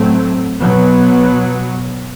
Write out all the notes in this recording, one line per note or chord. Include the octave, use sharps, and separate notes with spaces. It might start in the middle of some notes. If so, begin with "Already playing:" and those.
Already playing: A2 F#3 A3 C4
B2 F#3 B3